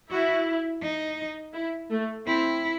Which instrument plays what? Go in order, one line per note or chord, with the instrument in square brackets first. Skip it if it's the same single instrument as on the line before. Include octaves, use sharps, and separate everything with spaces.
[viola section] E4 [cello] F#4
[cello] D#4
[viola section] E4
A3
[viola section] C4 [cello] E4